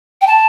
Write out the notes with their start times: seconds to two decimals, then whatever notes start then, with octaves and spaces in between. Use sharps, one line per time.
0.21 G5
0.27 A5